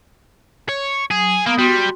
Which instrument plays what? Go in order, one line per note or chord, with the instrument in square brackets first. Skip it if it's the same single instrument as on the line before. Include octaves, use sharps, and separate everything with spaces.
[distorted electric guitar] C#5
[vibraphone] F#3 [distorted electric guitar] G#4
[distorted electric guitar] A#3 [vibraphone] B3 D#6
[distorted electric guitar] G3 [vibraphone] F#4 C6